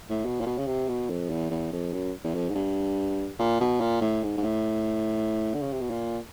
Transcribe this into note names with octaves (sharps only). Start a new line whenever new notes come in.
A2
B2
A#2
B2
C#3
C3
B2
F2
E2
E2
F2
F#2
E2
F2
G#2
G2
A#2
B2
A#2
A2
G#2
G#2
A2
D3
C#3
C3
B2
A#2